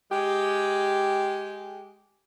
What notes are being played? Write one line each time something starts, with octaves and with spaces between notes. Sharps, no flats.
G#3 G4